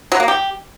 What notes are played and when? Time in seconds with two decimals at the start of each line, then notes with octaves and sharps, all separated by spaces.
0.12 F#3
0.20 A#3
0.28 G4